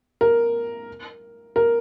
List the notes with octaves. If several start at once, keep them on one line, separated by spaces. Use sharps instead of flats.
A#4
A#4